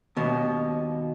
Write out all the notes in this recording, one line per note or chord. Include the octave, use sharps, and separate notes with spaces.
D#2 B2